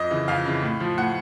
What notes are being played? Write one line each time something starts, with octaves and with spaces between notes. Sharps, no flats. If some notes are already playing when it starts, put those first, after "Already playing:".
Already playing: F2 D#5
C#3 E3
F2 F5
C#3 E3
A2
F3
A2 F#5